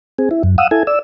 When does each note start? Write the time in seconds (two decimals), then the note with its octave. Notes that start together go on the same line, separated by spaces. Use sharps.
0.19 C4 G#4
0.31 E4
0.43 F#2
0.58 F5 F#5 D#6 E6
0.71 E4 A4 G#5
0.87 D5 E6